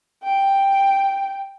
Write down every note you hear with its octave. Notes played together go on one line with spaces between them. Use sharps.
G5